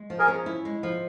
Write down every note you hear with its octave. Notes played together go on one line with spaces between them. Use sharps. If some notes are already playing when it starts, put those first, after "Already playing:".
Already playing: G#3
F3
G#4 A#4
C#4
E4
G#3
F3